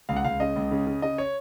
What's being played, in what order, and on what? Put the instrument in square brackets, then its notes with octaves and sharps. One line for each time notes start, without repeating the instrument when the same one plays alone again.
[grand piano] C#2 F5
F#5
C#2 F5
C#3 D#5
C#2
C#3
C#3
C#3 D#5
C#5